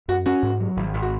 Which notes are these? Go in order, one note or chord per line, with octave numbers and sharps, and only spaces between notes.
F#2 F#4
C#4 F#4
G#2
F#3
G#1
G#1
F#4